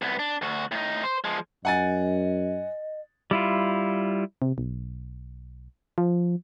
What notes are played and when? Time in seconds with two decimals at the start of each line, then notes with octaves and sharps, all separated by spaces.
0.02 C2 B3
0.19 D4
0.42 D2 F#4
0.72 A2 D#4
1.04 C5
1.24 F3 G#3
1.65 F#2 D#5 F#5 G#5 A6
3.31 G3 E4 F4
4.42 C3
4.58 B1
5.98 F3